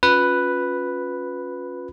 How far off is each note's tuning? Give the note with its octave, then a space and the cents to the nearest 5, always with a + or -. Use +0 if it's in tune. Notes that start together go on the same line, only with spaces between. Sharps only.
C#4 +5 F4 +40 B4 +0